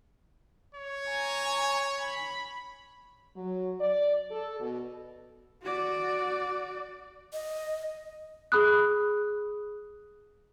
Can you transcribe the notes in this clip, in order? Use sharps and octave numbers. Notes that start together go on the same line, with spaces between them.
C#5
G#5 A#5
B5
F#3
D5
A4
B2
F#4 D5
D#5
G#4 B5 D#6 F#6